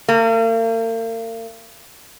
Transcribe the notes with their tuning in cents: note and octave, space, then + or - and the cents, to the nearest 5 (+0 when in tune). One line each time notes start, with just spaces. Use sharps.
A#3 -45